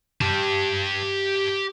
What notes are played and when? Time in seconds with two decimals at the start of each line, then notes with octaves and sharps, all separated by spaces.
0.21 G4 A5